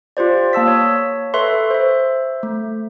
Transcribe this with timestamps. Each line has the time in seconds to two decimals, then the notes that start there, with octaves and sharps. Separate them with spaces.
0.17 F4 G4 C5 D5
0.53 A#3 A5 E6 B6
0.68 C#5
1.34 A4 B4 E5 C6 C#6
1.71 C5 E5
2.43 A3